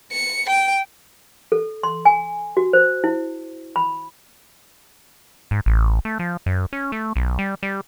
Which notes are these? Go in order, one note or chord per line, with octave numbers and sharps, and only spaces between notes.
C#7
G5
A4
C6
G#5
F#4
C5
E4
B5
G#2
A1
A3
F3
F#2
C#4
A3
B1
G3
G3